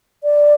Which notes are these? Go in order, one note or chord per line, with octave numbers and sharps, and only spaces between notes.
D5